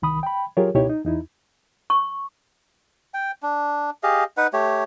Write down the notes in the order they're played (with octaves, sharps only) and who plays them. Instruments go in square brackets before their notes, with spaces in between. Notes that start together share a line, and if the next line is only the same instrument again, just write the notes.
[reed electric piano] C2 D#3 B5 D#6
G5 B5
F#3 F4 G4 G#4 A#4 C#5
C#2 B2 D#4 E4 G4 C#5
D#4
E2 D#4 E4
[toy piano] C#6
[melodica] G5
D4
G4 G#4 D#5 F5
D#4 B4 F#5
A3 G4 C#5